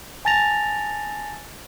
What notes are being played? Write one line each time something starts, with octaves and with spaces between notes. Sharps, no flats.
G#5 A5 A6 A#6 F7